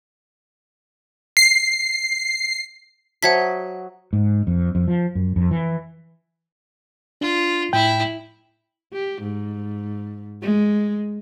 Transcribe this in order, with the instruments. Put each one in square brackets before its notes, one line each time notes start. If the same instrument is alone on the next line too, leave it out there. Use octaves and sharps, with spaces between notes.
[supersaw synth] C7
[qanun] F#3 D#5 [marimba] C5 E5 A5 [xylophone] F#5 G#6 B6
[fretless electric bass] G#2
F2
F2
F3
F#2
F2
E3
[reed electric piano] D4 [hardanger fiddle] F4
[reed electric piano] A2 G5 [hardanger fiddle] E4
[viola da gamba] G4
G#2
G#3